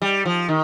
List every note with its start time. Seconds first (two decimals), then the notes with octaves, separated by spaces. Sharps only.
0.02 G3
0.26 F3
0.49 D#3